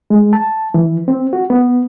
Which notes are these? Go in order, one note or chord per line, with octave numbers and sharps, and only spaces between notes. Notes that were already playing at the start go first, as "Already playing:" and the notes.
G#3
A5
E3
C4
F#4
B3